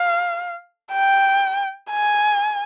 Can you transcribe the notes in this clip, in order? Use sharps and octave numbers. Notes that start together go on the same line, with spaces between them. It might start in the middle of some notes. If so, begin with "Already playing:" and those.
Already playing: F5
G5
G#5